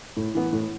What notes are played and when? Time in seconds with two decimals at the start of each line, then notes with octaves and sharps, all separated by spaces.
0.17 A2
0.34 E3 B3
0.53 A2